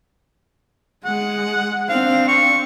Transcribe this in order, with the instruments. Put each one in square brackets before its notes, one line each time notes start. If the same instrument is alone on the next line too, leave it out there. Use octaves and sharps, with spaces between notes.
[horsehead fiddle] G#3 [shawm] F#5
[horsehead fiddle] C4 D4 [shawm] F5
[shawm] C#6